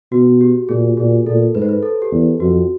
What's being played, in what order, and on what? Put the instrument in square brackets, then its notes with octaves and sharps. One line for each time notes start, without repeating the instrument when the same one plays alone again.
[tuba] B2 [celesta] F#4
[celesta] G4
[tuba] A#2 [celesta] G#4
[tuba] A#2 [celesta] G#4
[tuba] A#2 [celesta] A4
[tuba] G#2 [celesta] B4
[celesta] C5
B4
A4
G4
[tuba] E2
[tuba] F2 [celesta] F#4